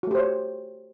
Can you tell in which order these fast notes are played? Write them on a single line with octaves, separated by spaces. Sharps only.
F#4 A3 G4 C5 C#5